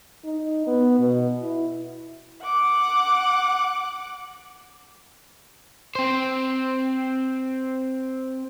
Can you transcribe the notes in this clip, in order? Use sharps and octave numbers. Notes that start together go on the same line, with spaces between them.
D#4
B3
B2
E4
F#5 D6
C4 C5